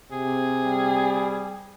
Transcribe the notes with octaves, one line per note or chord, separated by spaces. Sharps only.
C3 G#4
G3